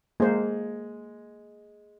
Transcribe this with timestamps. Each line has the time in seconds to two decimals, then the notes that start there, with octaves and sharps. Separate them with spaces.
0.20 G#3 A#3 C5